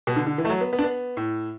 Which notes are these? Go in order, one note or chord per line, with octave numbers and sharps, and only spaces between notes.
B2
D3
D3
E3
A3
F#3
B3
B3
D4
B3
A2